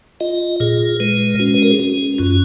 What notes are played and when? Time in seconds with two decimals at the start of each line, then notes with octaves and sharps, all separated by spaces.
0.20 F4 D#5
0.60 A#2 G#4
1.00 G#3 B4
1.39 C#4 F#4
1.54 B4
1.63 A#4
1.71 G#4
1.79 C#4 F#4
2.18 F#2 F4